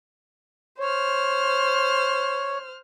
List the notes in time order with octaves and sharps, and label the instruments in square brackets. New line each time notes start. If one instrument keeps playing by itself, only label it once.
[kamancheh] C5 F6 [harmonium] C#5